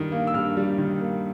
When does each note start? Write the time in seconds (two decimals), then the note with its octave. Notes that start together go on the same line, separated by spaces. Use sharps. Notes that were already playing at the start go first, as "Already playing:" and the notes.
Already playing: G2 D#3 G3
0.12 A#3
0.27 E6
0.34 G2 F6
0.57 G3
0.78 D#3
1.00 A#3